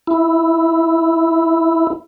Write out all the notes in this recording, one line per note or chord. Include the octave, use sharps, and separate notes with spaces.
E4